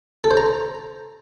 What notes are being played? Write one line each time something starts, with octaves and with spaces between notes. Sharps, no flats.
A4
C5
A#5